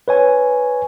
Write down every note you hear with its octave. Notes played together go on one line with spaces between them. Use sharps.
B4 C#5 G#5